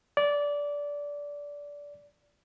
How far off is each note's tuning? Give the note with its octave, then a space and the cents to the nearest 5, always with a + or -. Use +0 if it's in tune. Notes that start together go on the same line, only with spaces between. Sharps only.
D5 -15